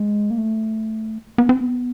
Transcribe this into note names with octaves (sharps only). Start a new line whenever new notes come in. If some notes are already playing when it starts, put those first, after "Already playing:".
Already playing: G#3
A#3
A3
B3
C4
B3